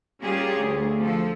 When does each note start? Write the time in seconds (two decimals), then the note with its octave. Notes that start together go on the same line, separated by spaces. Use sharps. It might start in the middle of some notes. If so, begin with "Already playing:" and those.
0.23 G3 A#3 C#4 F4 G4 G#4
0.58 D2
1.03 F3 A4